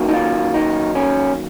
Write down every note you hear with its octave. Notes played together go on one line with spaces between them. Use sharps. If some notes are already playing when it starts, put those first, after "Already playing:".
Already playing: F#2 D#3 F#3 A#3
D#4
F4
D#4
C#4